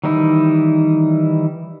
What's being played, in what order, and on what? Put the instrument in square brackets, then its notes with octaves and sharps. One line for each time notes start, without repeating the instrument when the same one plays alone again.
[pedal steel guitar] D#3 E3 G3 D#4 E4